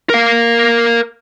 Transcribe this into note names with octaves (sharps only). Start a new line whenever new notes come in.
A#4 F5